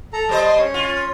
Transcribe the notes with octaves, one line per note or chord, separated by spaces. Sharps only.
A4 A#5
G3 C5 D#5 A5
C6 D#6
C#4 C#5
F4